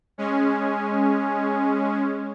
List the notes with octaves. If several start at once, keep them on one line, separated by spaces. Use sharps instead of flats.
G#3 C#4